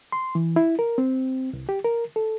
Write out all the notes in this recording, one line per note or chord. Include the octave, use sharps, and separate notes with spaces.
C6
E3
E4
A#4
C4
C2
G4
A#4
A4